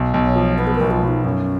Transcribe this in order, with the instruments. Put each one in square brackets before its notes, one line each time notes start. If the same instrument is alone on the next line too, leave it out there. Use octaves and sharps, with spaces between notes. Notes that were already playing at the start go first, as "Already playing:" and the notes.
Already playing: [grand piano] B1
B1
[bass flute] C#5
[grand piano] F3
[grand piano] B3 [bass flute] B4
[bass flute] G#4
A#4
[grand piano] B1
[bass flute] F4
[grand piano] B1
[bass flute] D#4
[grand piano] F#2 [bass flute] C#4